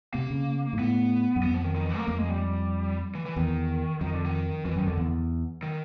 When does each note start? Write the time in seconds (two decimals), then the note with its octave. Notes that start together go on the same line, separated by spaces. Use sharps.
0.14 C3 A#3
0.30 C#3
0.73 G#2
0.79 A2 B3
1.36 F#2
1.43 F2 B3
1.54 F3
1.64 D#3
1.75 D#3
1.86 E3
1.97 A#3
2.07 F2 A#3
2.18 G#3
2.29 G3
3.15 E3
3.26 E3
3.36 E2 D#3
4.01 F2 D#3
4.13 D3
4.25 D#3
4.65 F2 E3
4.76 F#2 D#3
4.87 F2 D3
4.98 E2
5.63 D#3